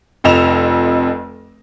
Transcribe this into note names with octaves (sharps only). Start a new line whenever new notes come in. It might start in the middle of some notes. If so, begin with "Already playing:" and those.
F1 F2 D#5 E7 F7